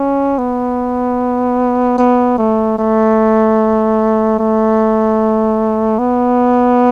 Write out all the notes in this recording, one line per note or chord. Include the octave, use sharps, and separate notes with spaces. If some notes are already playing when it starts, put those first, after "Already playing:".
Already playing: C#4
B3
B3
A3
A3
A3
B3